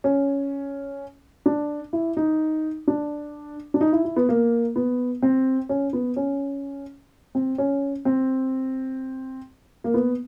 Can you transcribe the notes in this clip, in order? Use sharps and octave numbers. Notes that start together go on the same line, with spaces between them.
C#4
D4
E4
D#4
D4
D4
D#4
E4
E4
B3
A#3
B3
C4
C#4
B3
C#4
C4
C#4
C4
A#3
B3